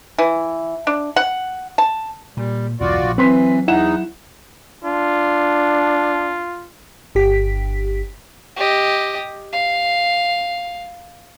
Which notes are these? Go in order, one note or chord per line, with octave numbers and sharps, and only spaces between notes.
E3
D4
F#5
A5
A#2 G3
B1 E2 G2 F4 F#4 D5
A#1
E3 F#3 C4 B4 C6 B6
E2 D#4 E4 F#5 E7
D4 F4
G1 G4 B6
G4 D#5
F5